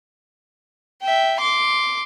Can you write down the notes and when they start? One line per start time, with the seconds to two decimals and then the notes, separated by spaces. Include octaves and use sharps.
1.02 E5 G5
1.40 C6 D6